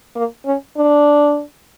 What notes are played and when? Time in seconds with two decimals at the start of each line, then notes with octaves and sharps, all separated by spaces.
0.15 A#3
0.46 C#4
0.77 D4